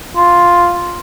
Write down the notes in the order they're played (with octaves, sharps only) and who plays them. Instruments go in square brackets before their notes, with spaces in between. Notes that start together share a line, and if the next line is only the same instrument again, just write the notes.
[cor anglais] F4